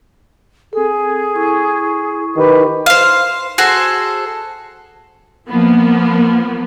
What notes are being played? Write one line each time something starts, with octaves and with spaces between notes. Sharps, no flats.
C4 G#4 A4
E4 C#6
D#3 G4 B4
C5 F5
F#4 G#4 A4 C5
F3 A#3 B3